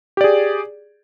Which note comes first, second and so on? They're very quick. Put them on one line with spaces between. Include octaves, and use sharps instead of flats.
G4 D5 G#4